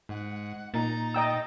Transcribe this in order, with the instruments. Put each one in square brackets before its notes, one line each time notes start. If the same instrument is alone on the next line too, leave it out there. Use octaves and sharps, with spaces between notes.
[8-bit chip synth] G#2 [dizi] F#5
[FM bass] A#2 [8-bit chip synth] D#4 A6 [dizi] A#5
[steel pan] D#5 G5 E6